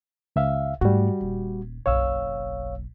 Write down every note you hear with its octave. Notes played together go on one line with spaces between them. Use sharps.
C#2 E5 F5
G#2 G3 A3 F#4
D#1
F#1 B1 C#5 F5 E6